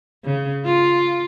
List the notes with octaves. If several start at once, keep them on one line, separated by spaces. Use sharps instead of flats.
C#3
F4